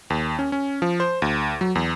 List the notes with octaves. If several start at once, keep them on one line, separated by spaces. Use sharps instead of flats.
D#2
C#4
C#4
F3
C5
D2
F#3
E2